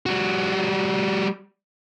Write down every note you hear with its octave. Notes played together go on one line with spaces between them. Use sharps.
G3 F#4